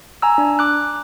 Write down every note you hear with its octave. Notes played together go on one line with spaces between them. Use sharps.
G#5 A#5 E6
D4
D6 F#6